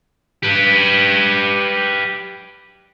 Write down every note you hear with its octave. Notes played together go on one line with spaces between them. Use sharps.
G4 B4